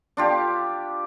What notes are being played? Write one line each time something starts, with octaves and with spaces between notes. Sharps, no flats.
D4 F4 G4